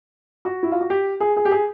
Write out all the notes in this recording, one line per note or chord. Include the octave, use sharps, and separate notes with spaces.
F#4
E4
F4
F#4
G4
G#4
G#4
G4
G#4